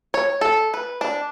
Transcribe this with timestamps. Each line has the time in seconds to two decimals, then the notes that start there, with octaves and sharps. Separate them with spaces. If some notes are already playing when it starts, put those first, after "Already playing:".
0.14 C#5
0.41 A4
0.74 B4
1.01 D4